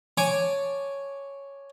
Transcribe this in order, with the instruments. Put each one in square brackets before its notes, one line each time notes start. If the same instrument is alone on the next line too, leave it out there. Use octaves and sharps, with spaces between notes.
[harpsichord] C#5 G#5 A5 C#6 D6